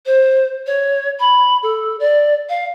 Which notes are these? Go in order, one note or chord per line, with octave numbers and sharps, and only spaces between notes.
C5
C#5
B5
A4
D5
F5